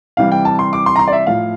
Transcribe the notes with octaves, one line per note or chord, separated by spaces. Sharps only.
C3 E3 G3 F5
G5
A5
C6
D6
C6
A#5
C6
D5
E5
A2 F3 F5